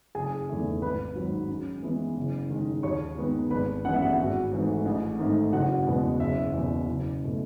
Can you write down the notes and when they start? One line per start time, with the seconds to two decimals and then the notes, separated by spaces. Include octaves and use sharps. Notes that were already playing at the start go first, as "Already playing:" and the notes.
0.15 F#1 G#4 G#5
0.49 E2 D#3 A3
0.82 G#1 B4 B5
1.15 G#2 D#3 F#3
1.49 F#2
1.83 E3 G#3 B3
2.16 F#1
2.50 F#2 D#3 G#3
2.83 D#2 C#5 C#6
3.18 D#3 G#3 B3
3.51 G#1 B4 B5
3.85 F#2 E3 G#3 B3 F#5
3.94 E5
4.02 F#4 F#5
4.18 G#1 F#4 F#5
4.52 G#2 E3 A3
4.86 A1
5.19 G#2 D#3 A3
5.53 F#1 F#4 F#5
5.86 E2 B2 G#3 B3
6.20 F#1 E5
6.53 E2 B2
6.87 F#1
7.23 B2 A3